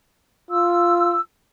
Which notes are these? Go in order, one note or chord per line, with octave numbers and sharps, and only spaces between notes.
F4 E6